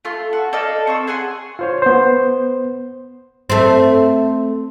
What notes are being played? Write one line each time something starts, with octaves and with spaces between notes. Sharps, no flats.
A3 F4 C6
F#4
A4 D5 D#5 F5
C4 C#6 E6
G#4 F#5 G#5 C6
F4 C5 C#5
B3 C5
A3 C4